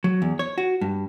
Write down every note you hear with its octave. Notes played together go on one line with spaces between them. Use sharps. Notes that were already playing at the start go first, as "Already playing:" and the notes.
F#3
E2
C#5
F#4
G2